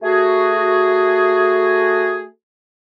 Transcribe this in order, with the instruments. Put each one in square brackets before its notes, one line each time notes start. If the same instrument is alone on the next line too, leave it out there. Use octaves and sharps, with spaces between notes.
[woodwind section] A3 F#4 G#4